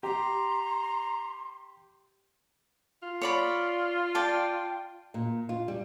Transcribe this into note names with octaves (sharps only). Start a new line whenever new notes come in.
G4 A#5 C6
F4
C#5 D5 B5
D5 G5 A5
A#2
F4
G3